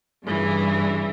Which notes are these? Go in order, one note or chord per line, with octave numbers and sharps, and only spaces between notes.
G2 C#3 E3